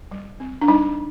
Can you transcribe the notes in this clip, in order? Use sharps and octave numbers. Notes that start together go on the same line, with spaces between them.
G3
C4
D4
G3 D#4